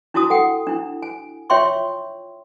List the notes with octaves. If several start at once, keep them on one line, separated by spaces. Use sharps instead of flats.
D4 E4 F#4 A5 D#6
A4 F#5 G5
D4 E4
G#5
F4 C#5 E5 G5 C6 C#6